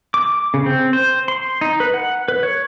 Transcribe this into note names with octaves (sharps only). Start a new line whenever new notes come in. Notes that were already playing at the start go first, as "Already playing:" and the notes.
D6
C#3
C4
C5
C6
D#4
B4
F#5
B4
C#5